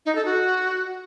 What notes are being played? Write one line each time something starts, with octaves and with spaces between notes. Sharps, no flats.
D#4
A4
F#4